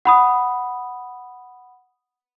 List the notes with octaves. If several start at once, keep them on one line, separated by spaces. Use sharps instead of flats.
F#5 B5 D#6